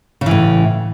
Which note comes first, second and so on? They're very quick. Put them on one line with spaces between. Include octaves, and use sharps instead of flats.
C#3 E3 A2